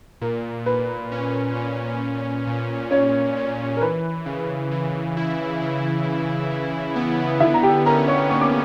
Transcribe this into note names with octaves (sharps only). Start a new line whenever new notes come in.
A#2 A#4
A#2 B4
C#4
A#2
A#2
A#2
A#2 C#4 C#5
A#2
A#4
E3 B4
C#3
E3
E4
C#3
E3
E3
B3
D3 E4 E5
A#5
G4 G5
C#4 A#4 A#5
C#5 C#6
A#3 C#6
D6